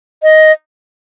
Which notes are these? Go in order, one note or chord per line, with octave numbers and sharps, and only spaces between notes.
D#5